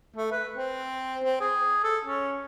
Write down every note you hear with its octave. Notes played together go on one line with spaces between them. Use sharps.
A3
B4
C4
C4
G#4
A4
C#4